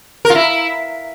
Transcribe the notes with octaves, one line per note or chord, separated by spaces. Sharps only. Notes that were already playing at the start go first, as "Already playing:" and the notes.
A#4
F4
E4